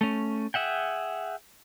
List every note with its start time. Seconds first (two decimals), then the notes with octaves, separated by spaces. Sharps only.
0.01 A3 C#4
0.54 G#4 E5 F#5 G5